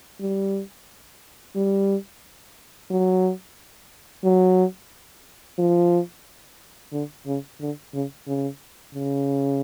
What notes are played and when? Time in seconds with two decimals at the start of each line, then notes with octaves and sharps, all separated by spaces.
0.21 G3
1.56 G3
2.91 F#3
4.24 F#3
5.59 F3
6.92 D3
7.26 C#3
7.60 D3
7.94 C#3
8.27 C#3
8.95 C#3